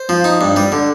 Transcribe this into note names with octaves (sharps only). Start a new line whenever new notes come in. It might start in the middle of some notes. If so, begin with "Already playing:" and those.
Already playing: C5
F3
D#4
G2
G3
D3